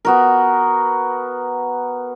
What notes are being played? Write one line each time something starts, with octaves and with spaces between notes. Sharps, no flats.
B3 F#4 A#4